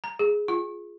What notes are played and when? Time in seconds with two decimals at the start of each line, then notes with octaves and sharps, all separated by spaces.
0.04 A#5
0.19 G#4
0.48 F4